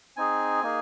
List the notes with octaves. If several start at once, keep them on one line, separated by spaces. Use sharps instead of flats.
C4 D#4 G#4 G#5
A#3 D#4 G#4